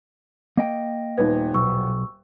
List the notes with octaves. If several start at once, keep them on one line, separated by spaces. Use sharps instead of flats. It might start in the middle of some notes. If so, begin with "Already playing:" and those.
A#3 D#5 G5
D#1 B3 D#4 G#6
B1 C#6 E6